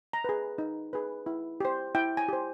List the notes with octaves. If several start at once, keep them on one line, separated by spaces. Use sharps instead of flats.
A#5
G#4 B4
D#4
G#4 B4
E4
G4 C5
E4 G5
G#5
G4 C5